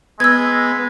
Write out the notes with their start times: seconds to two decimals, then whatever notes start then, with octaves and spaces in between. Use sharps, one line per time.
0.20 G#3 B3 E6 G#6